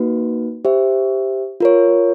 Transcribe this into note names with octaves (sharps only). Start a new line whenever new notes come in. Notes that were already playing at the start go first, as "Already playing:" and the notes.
Already playing: A#3 D#4 F#4 B4
G4 C5 E5
F4 A#4 C#5